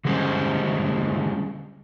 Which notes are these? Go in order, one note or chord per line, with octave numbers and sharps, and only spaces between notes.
D3 G3 G#3 C4 C#4 C5